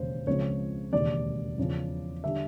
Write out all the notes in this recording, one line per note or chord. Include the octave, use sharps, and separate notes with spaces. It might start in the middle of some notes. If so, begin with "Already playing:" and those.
Already playing: E1 D#2 C#3 C5
C#2 C#3 F3 G#3 C4 C#5
E1 D#2 C#3 D5
E2 C#3 F3
D3 G3 E5